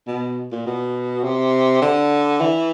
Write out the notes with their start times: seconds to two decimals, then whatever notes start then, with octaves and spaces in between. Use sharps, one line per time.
0.07 B2
0.52 A#2
0.66 B2
1.24 C3
1.82 D3
2.41 E3